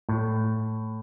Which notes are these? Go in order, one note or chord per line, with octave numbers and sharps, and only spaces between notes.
A2